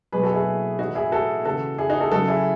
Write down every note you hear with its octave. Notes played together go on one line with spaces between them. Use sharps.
B2 F#3 G#4 B4
F#4 A4
E4 G#4
A2 E3 D#4 F#4
E4 G#4
F#4 A4
C#3 E3 F#4 A4
E4 G#4
D#4 F#4
F#4 A4
C#3 F#3 F#4 A4
E4 G#4